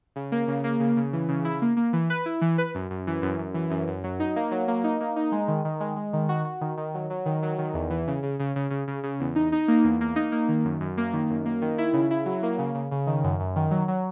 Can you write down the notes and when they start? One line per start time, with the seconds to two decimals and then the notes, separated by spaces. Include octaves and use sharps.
0.16 C#3
0.32 A#3
0.48 C#3
0.64 A#3
0.80 C#3
0.96 C#3
1.13 E3
1.29 C#3
1.45 E4
1.62 A#3
1.77 A#3
1.93 E3
2.10 B4
2.26 E4
2.41 E3
2.58 B4
2.75 F#2
2.90 F#2
3.07 E3
3.22 F#2
3.39 F#2
3.54 E3
3.70 F#2
3.88 F#2
4.04 F#3
4.20 D#4
4.36 A#3
4.51 F#3
4.68 A#3
4.84 D#4
5.01 A#3
5.16 D#4
5.32 G#3
5.48 D#3
5.65 D#3
5.80 G#3
5.96 G#3
6.13 D#3
6.29 F#4
6.45 F#4
6.61 D#3
6.77 D#3
6.94 F#3
7.10 F#3
7.26 D#3
7.43 F#3
7.58 D#3
7.74 E2
7.90 E3
8.07 C#3
8.23 C#3
8.40 C#3
8.56 C#3
8.71 C#3
8.88 C#3
9.03 C#3
9.20 E2
9.35 D#4
9.52 D#4
9.68 A#3
9.84 E2
10.01 A#3
10.16 D#4
10.32 A#3
10.48 D#3
10.65 F#2
10.80 F#2
10.97 A#3
11.13 D#3
11.30 F#2
11.46 A#3
11.62 D#3
11.78 E4
11.93 C#3
12.11 E4
12.26 F#3
12.43 A#3
12.58 C#3
12.74 C#3
12.91 C#3
13.07 D#3
13.24 F#2
13.40 F#2
13.56 D#3
13.71 F#3
13.88 F#3